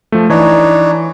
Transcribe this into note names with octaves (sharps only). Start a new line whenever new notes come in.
F3 A3
E3 D4 D#4 C#5